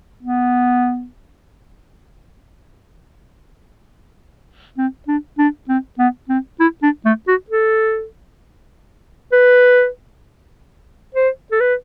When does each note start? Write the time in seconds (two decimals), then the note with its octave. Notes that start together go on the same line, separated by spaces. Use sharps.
0.23 B3
4.77 C4
5.08 D4
5.38 D4
5.68 C4
5.99 B3
6.29 C4
6.60 E4
6.83 D4
7.05 A3
7.28 F#4
7.50 A4
9.32 B4
11.15 C5
11.51 A4
11.60 B4